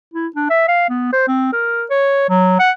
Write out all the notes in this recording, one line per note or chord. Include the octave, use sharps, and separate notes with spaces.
E4
D4
E5
F5
B3
C5
C4
A#4
C#5
F#3
F#5